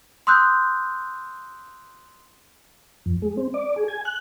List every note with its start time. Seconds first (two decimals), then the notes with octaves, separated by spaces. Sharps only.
0.27 C6 D#6 E6 F#6 G6
3.06 F2
3.22 G#3
3.37 C4
3.54 D5
3.76 G#4
3.88 G#5
4.05 F#6